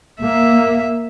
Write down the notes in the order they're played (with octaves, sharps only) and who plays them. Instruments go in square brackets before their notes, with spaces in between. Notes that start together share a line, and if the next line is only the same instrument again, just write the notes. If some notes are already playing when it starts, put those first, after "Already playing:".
[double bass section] A#3 [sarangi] E5